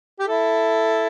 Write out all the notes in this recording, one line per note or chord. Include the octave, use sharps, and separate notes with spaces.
G4
E4 A4